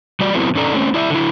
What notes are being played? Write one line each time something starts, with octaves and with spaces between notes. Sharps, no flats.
G3 F#4 D5
F#3 A3 B3 C4 D#4 E4
D3 C#4 D#4 A4 D5 A#5
A3 C4 C#4
E4 D5 E5
D3 E4